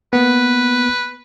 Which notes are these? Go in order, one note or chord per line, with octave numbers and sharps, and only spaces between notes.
A#3 B3 B4